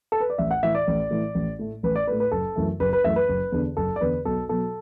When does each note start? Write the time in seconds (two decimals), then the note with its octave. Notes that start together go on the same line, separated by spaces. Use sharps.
0.12 A4
0.20 B4
0.30 D5
0.38 A1 E5
0.51 F#5
0.63 A2 E3 A3 E5
0.75 D5
0.87 A1
1.10 A2 E3 A3
1.35 A1
1.59 A2 A3
1.83 A1 B4
1.96 D5
2.07 A2 A3 B4
2.20 B4
2.31 F#1 A4
2.56 F#2 E3 A3
2.80 F#1 B4
2.93 B4
3.04 F#2 E3 A3 E5
3.16 B4
3.28 F#1
3.52 E2 D3
3.77 F#1 A4
3.96 D5
4.01 E2 D3 B4
4.25 B1 A4
4.49 B2 F#3 A4